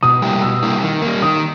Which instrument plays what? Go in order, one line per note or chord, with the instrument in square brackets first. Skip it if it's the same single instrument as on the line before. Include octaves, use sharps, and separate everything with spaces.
[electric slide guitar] B2 [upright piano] D#6
[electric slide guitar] G3 A#3 E4 G4
[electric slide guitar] B2 [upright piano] E6
[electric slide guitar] G3 A#3 E4 G4
D#3
A#3
G3
[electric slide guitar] D#3 [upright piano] D#6